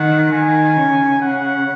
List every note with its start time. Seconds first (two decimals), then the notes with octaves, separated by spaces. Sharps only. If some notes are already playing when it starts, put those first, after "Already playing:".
Already playing: D#3 F#5
0.32 D#3 G#5
0.77 C#3
1.22 C#3 F#5